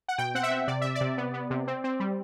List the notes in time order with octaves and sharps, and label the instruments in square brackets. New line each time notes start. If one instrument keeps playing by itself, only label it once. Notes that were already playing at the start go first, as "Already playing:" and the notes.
[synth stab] F#5
B2 G5
C4 F#5
E5
C4
C3 D5
C3 E5
D5
C3
B3
B3
C3
C4
C4
G3